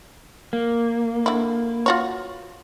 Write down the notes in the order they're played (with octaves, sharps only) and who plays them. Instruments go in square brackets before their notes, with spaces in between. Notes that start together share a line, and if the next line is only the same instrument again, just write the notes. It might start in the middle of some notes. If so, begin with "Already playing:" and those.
[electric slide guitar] A#3
[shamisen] D3 E4
F4 F#4 C#5